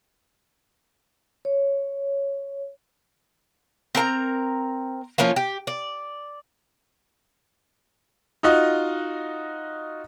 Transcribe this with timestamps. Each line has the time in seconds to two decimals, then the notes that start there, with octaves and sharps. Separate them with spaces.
1.45 C#5
3.95 C4 A#4 A5 A#5
5.18 F3 A#3 C#4 F4
5.36 G4
5.67 D5
8.43 D#4 F4 F#4 D#5